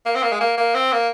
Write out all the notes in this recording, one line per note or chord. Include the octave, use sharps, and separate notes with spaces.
A#3
C4
A#3
G#3
A#3
A#3
C4
A#3